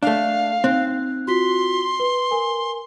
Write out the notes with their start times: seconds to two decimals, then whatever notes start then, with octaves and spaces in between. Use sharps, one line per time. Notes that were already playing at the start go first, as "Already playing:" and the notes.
0.03 A3 D4 F5
0.64 C4 D#4 F#6
1.27 F4 F#4 C6 B6
2.00 B4
2.31 A#4 G#5